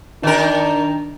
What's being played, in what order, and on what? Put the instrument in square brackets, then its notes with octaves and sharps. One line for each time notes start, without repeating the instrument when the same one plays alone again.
[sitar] D#3 A#4 [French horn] D4